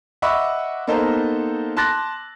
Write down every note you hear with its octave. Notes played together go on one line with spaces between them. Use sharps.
D#5 E5 F#5 B5 C#6 D6
A#3 B3 D#4 A4 A#4 C5
A5 C6 D6 F#6 A6 A#6